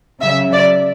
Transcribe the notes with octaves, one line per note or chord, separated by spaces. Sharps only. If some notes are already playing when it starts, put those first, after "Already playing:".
C#3 F#3 E5
D5